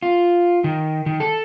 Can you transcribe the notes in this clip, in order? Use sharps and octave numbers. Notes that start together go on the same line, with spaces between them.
F4
D#3
D#3
A4